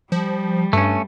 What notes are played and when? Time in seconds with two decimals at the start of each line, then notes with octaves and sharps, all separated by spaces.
0.12 F3 G3
0.73 G2 A3 C#4